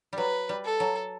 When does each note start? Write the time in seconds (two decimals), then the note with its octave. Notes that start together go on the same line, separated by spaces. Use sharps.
0.13 F#3 G3 B4
0.49 G3
0.65 A4
0.80 F#3